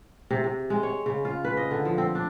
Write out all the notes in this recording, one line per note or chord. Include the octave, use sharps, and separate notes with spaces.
C3
C3
G#3
C#5
C#3
F4
B4
D#5
D3
F3
C4
D4